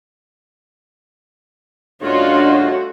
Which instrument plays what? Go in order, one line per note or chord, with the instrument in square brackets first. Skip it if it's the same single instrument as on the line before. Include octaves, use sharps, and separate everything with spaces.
[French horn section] G2 C#3 D4 [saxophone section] A3 F#4 [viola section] F4 [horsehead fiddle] C#5 D#5